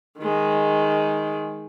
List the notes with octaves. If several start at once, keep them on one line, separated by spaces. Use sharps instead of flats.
D#3 G#3